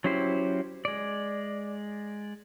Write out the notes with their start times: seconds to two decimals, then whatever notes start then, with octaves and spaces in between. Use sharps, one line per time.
0.04 F#3 C#4 E4 G4 C5
0.85 G#3 D5